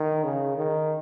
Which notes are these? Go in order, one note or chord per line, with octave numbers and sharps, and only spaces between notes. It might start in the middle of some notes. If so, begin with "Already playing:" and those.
Already playing: D#3
C#3
D#3